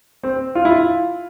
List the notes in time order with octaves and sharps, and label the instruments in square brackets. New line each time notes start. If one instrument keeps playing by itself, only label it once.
[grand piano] C4
F4
E4
F4